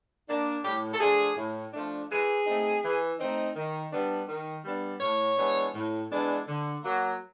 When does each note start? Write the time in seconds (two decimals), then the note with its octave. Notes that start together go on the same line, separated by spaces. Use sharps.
0.28 A#3 D4
0.64 A2 G4
0.94 A4
1.00 F3 A3 D4 G#4
1.37 A2
1.73 F3 A3 D4
2.10 E3 G#4
2.46 A3 C4 D#4
2.83 E3
3.19 A3 C4 D#4
3.56 D#3
3.91 G3 B3 D4
4.28 D#3
4.64 G3 B3 D4
5.01 A2 C#5
5.37 E3 G#3 B3 D4
5.74 A2
6.11 E3 G#3 B3 D4
6.47 D3
6.83 F#3 A#3